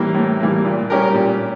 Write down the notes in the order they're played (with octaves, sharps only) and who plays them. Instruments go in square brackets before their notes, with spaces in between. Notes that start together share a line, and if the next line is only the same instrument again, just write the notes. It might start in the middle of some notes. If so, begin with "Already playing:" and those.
Already playing: [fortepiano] A2 E3 G3 A#3
A2
E3 G3 A#3
A#2
G3 C#4 G4 A#4
A#2